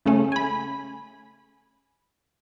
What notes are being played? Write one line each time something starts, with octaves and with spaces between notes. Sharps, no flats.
C#3 A3 C#4
G#5 B5